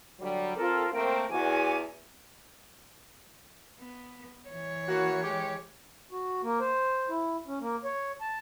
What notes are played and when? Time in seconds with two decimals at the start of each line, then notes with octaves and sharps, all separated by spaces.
0.20 D3 F#3 G3
0.56 C4 F4 A4 A#4
0.92 A3 A#3 C4 A#4 G5
1.30 E2 F#4 G#5 D6
3.80 B3
4.49 E3 C#5
4.89 A#3 E4 F#4
5.23 G#3 G4
6.12 F#4
6.43 A#3
6.61 C5
7.09 E4
7.47 C#4
7.60 A#3
7.84 C#5
8.21 A5